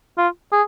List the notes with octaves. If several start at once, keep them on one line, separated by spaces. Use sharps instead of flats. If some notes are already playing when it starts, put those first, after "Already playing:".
F4
G#4